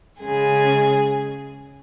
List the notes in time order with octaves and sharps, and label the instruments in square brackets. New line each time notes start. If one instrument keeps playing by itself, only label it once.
[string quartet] C#3 G#3 G#4